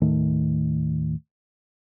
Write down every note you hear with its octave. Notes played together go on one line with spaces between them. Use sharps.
D#2 A2 D#3 A3